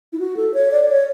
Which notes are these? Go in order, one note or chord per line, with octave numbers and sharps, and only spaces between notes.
E4
F#4
A4
C#5
D5
C#5